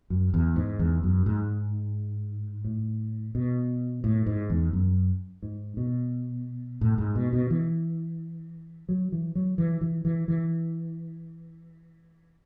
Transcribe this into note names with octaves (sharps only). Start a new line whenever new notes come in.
F#2
E2
G#2
E2
F#2
G#2
A2
B2
A2
G#2
E2
F#2
G#2
B2
A2
G#2
B2
B2
E3
F#3
E3
F#3
E3
E3
E3
E3